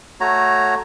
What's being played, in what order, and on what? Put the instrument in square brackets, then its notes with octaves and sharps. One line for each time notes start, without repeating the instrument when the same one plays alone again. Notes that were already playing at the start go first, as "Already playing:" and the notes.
[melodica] A3 F#4 C#5 A#5